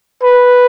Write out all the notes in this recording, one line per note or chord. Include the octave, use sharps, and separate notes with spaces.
B4